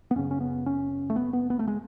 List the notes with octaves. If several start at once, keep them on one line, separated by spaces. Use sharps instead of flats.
B3
F#2 C#3 C#4
C#4
B3
C#4
A3
B3
B3
B3
A3
G#3